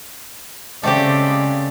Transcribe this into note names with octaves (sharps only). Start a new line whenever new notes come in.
C#3 G#3 A3 C4 G4 D5